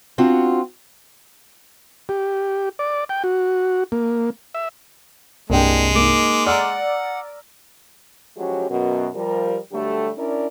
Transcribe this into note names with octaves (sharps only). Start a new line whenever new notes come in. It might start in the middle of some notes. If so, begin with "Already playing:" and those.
C4 D4 F4 F#4 F#5
G4
D5
G5
F#4
A#3
E5
C2 G2 G#3 A#3 D4 G5
A#3 D#4 D6
D5 F#5 A#5 E6 F6
F3 F#3 G#3 C#4 F#4 G4
F#2 B2
F3 G3 A#4
D3 F#3 G3 A3 G4 A4
C#4 D4 E4 A#4 D5